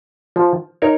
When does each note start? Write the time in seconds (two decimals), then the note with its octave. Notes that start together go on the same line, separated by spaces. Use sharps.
0.36 F3
0.82 D#4 A#4 C#5